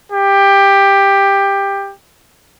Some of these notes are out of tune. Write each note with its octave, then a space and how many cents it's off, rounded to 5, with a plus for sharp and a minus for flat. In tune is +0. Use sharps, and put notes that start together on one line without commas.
G4 +15